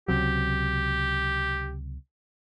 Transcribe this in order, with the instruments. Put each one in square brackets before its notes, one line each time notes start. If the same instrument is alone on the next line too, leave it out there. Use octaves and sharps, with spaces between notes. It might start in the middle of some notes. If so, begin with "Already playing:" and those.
[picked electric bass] C#2 C3 F#3 [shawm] G4